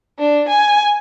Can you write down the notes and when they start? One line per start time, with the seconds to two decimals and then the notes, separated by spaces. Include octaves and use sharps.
0.18 D4
0.48 G#5